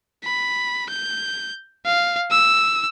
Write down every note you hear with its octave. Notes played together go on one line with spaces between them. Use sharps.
B5
G6
F5
E6